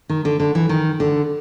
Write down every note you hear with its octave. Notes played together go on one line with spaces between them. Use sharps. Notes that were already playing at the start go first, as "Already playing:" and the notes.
D#3
D3
D3
E3
D#3
D3